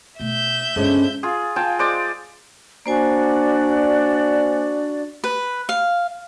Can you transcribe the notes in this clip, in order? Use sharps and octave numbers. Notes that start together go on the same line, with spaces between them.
B2 A3 E5 G6
G2 D3 F3 G#3 B3 C#4
F4 G#4
F4 G#4 G5 A5
G#3 C5 D5
A#3 D4 F#4 C5 D5 G#5
B4
F5